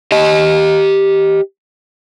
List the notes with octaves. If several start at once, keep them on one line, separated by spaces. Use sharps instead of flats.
G4 D#5